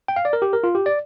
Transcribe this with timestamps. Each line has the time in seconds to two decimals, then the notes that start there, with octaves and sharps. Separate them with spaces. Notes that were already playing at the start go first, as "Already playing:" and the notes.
0.08 G5
0.16 F5
0.25 D5
0.33 A#4
0.42 G4
0.53 A#4
0.64 F4
0.75 G4
0.86 D5